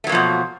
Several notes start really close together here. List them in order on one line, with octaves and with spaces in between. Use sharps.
A3 F#3 A#3 F3 B2